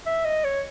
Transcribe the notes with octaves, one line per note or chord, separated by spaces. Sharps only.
E5
D#5
C#5